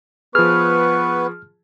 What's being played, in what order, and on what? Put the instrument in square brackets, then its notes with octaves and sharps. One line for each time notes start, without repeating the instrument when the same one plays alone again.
[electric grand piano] F3 G#4 [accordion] B3 B4 [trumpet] C#6 [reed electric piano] F6